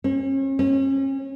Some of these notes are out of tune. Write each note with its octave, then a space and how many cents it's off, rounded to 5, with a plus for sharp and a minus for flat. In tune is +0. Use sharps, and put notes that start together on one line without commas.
C#4 -40
C#4 -35